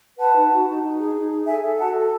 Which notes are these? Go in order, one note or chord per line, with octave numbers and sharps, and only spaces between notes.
B4 F#5 A5
D#4
F#4
D#4
D#4
G#4
D#4
G#4
A4 E5 G#5
A4
F#4 F#5 A5
A4